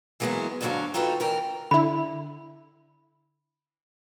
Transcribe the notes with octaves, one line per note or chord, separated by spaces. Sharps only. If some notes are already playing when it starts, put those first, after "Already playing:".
E3 F#3 G#3 A#3 B3 E4
D2 G#2 D3 F#3 F#4 F5
C4 D#4 F4 F#4 A4 B4
D2 E3 A#4 G5
D3 E4 B5